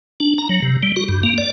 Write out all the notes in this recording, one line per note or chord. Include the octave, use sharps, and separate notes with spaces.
D4
A#5
F#3
C3
G3
F#4
G2
A#3
D5